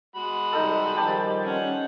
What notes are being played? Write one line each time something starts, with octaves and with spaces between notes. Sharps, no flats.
G#3 F#4 B5
C3 G3 D#4 G4 A4
D#3 F3 G3 G4 C5 A5
C#4 F#5